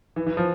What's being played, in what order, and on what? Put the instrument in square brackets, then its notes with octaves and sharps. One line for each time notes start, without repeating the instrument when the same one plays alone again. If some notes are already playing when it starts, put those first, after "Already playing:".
[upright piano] E3
E3
F3